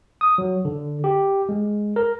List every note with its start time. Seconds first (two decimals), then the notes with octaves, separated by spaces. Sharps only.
0.21 D#6
0.38 F#3
0.65 D3
1.04 G4
1.49 G#3
1.96 A#4